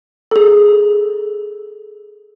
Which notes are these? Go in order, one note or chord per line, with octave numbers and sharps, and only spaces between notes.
G#4 A4